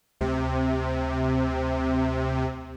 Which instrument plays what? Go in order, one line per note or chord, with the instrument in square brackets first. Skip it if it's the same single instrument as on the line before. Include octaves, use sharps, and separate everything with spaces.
[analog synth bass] D2 [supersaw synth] C3